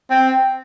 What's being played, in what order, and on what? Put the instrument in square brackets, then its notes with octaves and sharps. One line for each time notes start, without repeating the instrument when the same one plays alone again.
[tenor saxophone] C4